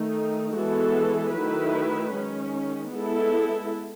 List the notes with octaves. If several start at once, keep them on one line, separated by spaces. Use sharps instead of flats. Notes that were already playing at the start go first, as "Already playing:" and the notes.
Already playing: D#3 A3 D#4
E3 G#3 B3 F#4 A4
D#3 F#3 A3 E4 B4
D#3 G#3 C#4
G#3 B3 E4 A4